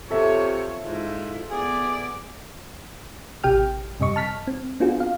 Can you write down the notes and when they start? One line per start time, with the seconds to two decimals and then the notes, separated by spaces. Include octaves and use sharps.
0.11 C3 F4 A4 C#5 E5
0.84 G#2 E4 F4
1.51 B3 G#4 D5
3.44 A1 C3 G4 G5 F6
4.00 F#2 C3 G3 D#5 C#6
4.16 A5 F6 B6
4.47 C4
4.80 B3 C4 D4 F4 F#4 G#4
5.00 F5